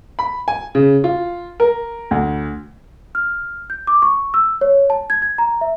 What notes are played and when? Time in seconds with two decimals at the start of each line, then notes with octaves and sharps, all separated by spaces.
0.19 B5
0.48 G#5
0.75 C#3
1.04 F4
1.60 A#4
2.11 D2
3.15 F6
3.70 G6
3.87 D6
4.02 C#6
4.34 E6
4.61 C#5
4.90 A5
5.10 G#6
5.22 G#6
5.38 A#5
5.61 E5